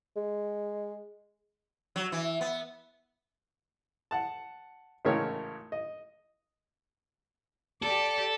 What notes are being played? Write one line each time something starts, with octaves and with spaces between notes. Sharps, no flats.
G#3
F#3
E3
B3
F#5 A5
G#1 A2 C#3 E3 A#4 C#5
D#5
G4 A4 D5